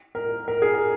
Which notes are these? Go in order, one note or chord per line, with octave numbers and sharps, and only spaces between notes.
A#4
A#4
G#4
A#4